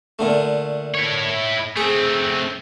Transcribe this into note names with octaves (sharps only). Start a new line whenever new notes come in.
A#2 D3 A3
E4 C#5
A3 C4 G#4